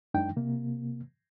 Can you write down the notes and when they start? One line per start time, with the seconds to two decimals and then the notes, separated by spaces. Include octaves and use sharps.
0.14 F#2 G#3 D4 D#4 G5
0.37 C3 A#3